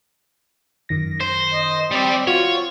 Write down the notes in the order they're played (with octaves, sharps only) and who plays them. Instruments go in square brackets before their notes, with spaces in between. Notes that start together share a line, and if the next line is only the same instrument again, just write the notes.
[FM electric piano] F#2 D#3 A#6
[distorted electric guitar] C5
[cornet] D#5
[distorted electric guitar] G3 D5 [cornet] C4
[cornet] F4 [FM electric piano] F#4 [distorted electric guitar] C#5